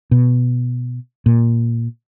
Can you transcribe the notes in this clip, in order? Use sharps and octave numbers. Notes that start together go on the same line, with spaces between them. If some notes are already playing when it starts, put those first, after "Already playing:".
B2
A#2